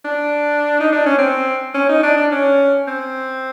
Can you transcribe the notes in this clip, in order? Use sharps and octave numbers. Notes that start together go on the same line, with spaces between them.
D4
D#4
D4
C#4
C4
C#4
D#4
D4
D4
C#4
C4